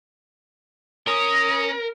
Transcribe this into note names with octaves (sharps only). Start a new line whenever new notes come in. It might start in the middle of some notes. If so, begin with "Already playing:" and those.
C#4 A#4 D#6